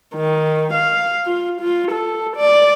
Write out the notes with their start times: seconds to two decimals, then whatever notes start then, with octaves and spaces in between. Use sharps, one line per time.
0.15 D#3
0.73 F5
1.26 F4
1.61 F4
1.92 A4
2.37 D5